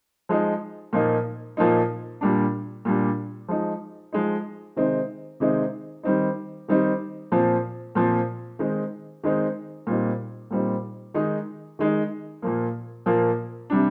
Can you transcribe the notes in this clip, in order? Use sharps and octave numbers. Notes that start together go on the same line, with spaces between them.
F3 G#3 D#4
A#2 F3 A#3 D#4
A#2 F3 A#3 D#4
A#2 G3 D4
A#2 G3 D4
F3 G#3 D#4
F3 G#3 D#4
C3 D#3 G#3 C4 D#4
C3 D#3 G#3 C4 D#4
D#3 G3 C4 D#4
D#3 G3 C4 D#4
A#2 F3 C4
A#2 F3 C4
D#3 G#3 C4 D#4
D#3 G#3 C4 D#4
A#2 G3 C4 D#4
A#2 G3 C4 D#4
D#3 G#3 D#4
D#3 G#3 D#4
A#2 F3 A#3
A#2 F3 A#3
C3 G3 D4